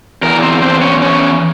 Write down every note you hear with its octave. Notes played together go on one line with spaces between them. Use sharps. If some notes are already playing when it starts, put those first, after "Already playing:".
E2 E3 A#4
C4 C5
C4 C5
C#4 C#5
C#4 C#5